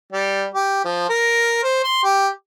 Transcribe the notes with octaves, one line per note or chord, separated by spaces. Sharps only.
G3
G4
F3
A#4
C5
C6
G4